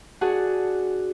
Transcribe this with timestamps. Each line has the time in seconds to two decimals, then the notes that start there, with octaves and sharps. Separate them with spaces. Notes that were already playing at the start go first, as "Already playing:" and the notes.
0.21 D4 F#4 G#4 F#5 A5